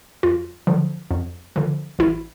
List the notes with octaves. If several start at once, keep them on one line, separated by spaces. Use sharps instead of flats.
F2 F4
D3 F3
F2
D3 F3
A1 E4